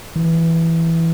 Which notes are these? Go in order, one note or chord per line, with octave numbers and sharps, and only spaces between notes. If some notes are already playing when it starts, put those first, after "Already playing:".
E3